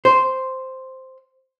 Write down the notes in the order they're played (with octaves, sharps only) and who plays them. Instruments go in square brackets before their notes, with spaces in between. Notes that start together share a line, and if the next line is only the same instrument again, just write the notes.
[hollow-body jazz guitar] C5